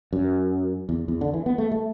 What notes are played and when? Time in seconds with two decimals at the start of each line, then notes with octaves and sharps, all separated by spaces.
0.13 F#2
0.89 E2
1.08 E2
1.21 D3
1.34 E3
1.46 B3
1.58 A3
1.72 A3